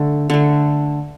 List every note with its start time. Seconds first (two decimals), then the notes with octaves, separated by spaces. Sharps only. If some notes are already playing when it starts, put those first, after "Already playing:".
Already playing: D3 A3
0.30 D3 A3